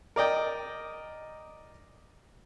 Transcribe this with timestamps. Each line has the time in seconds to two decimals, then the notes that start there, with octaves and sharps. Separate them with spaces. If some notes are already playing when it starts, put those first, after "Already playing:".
0.16 A#4 D5 D#5 G5